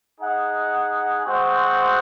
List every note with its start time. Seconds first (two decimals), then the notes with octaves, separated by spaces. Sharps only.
0.20 D#4 G#4 D#5 F#5
1.26 G#3 C4 F#4 C5 F#5